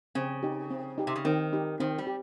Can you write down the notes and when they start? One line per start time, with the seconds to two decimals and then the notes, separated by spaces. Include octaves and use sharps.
0.15 C#3 C4
0.43 D#4 G4
0.70 C4
0.98 D#4 G4
1.07 C3
1.16 C#3
1.25 D#3 C4
1.53 D#4 G4
1.80 D#3 C4
1.98 G3
2.07 G4